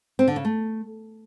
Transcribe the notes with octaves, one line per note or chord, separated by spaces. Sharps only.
C4
D3
C#3
A3